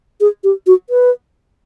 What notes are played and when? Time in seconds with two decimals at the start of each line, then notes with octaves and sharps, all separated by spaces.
0.20 G#4
0.44 G4
0.67 F#4
0.90 B4